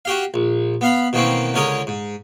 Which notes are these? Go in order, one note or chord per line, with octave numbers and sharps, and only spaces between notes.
F#4 G4 F5
A#1
B3 F5 B5
B2 D#3 E3 A#3 C4 C#4
C#2 D3 C#4 A#4 C#5 D#6
G#2